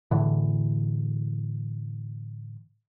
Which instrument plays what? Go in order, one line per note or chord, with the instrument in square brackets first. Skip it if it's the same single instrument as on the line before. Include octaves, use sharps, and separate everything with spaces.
[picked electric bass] A2 D3 E3